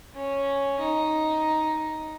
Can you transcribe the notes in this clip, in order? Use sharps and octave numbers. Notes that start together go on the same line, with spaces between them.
C#4
D#4